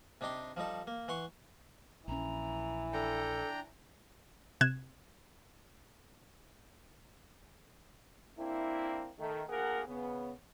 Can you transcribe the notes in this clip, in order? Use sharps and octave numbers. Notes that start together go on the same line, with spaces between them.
C3 D4 D#4 G4 C6
F3 G3 D#4 A4
A#3
E3 F#5 C6 C#6
A#1 E3 C#4 A#5
D4 A4 G5 A#5
C3 F#6 G#6 E7
A#3 C4 D4 E4
D#3 A3
D2 A#3 G#4 A#4 F#5
C#3 B3